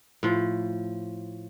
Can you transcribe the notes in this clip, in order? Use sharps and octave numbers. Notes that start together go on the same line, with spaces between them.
A2 F3